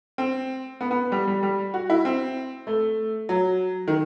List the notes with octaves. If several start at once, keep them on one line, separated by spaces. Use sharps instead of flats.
C4
B3
B3
G3
G3
G3
F#4
E4
C4
A3
F#3
D#3